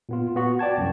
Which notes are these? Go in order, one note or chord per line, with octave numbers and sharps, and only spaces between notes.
A#2 B3 F4
B3 F#4
D5 G5 A5 G#6
C2 F#2